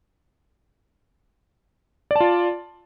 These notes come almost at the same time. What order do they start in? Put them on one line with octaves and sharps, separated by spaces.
D5 A5 F4